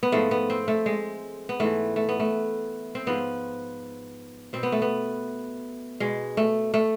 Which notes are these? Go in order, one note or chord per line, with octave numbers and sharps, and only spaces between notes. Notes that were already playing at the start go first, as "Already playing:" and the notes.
B3
G#2 F3 A3
B3
C4
A3
G#3
B3
G#2 E3 A3
A3
B3
A3
C4
G#2 F3 B3
B2 C4
B3
A3
B3
B2 G#3
A3
A3